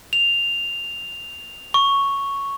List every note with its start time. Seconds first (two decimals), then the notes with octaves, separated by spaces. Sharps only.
0.13 F7
1.74 C#6